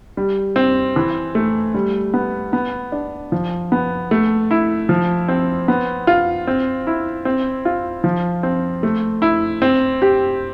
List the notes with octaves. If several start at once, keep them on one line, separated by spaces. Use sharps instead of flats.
G3
C4
E3
A3
G3
B3
B3
D4
F3
B3
A3
E4
F3
C4
B3
F4
C4
E4
C4
F4
F3
C4
A3
E4
C4
G4